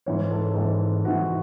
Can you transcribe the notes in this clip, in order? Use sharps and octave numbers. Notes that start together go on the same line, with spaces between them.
G#2 E3 C#5
A4
G#2 E3 A4
G#2 E3 F#4